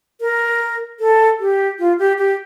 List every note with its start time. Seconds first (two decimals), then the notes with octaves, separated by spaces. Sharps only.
0.21 A#4
1.00 A4
1.40 G4
1.79 F4
1.99 G4
2.18 G4